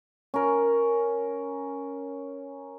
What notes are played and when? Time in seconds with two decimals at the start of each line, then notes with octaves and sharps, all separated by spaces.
0.34 C#4 A#4